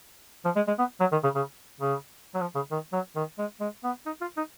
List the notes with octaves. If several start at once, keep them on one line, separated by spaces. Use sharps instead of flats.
F3
G#3
G#3
B3
F#3
D#3
C#3
C#3
C#3
F#3
F3
C#3
D#3
F#3
D#3
G#3
G#3
B3
D#4
F4
D#4